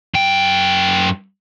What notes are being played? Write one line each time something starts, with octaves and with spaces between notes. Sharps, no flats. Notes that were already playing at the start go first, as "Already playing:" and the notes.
F#2 G5